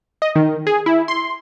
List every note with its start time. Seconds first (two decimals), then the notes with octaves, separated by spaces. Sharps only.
0.22 D#5
0.36 D#3
0.67 G#4
0.86 E4
1.08 C6